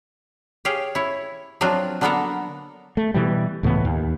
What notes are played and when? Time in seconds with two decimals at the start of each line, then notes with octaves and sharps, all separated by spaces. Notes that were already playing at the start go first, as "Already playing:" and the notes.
0.65 G4 G#4 C#5 F5 G5
0.95 E4 C#5
1.61 F3 F#3 C4 D4 F4 F#4
2.01 D3 A#3 B3 D4 A4 A#4
2.97 A3
3.14 B2 E3 G3
3.63 C#2 A2 E3 B3
3.85 D#2